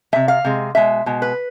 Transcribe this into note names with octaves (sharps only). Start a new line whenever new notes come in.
C3 G#3 E5
F5
C3 G#3
B2 G#3 E5
B2 G#3
B4